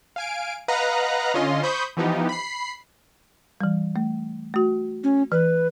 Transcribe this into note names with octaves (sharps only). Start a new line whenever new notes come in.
F5 G#5 D7
B4 D#5 F5 F#5 A#5 F#6
D3 C#4 F4 D#5 C6
C5 B5 C#6 D#6 G6
E3 F3 B3 D#4 G4
B5 C7
E3 G3
A3
A3 F#4
C#4
E3 B4